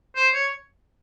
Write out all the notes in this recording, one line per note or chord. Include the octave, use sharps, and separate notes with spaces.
C5
C#5